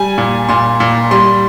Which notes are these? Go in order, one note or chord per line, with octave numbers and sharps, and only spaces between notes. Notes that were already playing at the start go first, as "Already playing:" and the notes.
Already playing: G3 G#5
A#2
A#2 C6
A#2
G3 C6